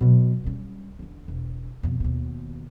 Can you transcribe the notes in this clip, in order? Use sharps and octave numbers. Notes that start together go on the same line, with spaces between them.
B2 F#3
G3 C#4
E2 D3
E1
F2 B2
D#2 B2